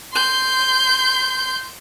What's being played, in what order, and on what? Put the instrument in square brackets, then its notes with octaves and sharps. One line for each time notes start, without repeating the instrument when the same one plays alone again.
[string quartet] C6 G6